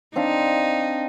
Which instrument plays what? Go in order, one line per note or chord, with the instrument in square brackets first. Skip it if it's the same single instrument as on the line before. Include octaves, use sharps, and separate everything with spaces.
[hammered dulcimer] C4 D4 F5 [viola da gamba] D#4